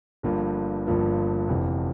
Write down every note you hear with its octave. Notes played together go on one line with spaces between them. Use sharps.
G1 G2 F3 A#3
G1 G2 F3 A#3
F1 F2 E3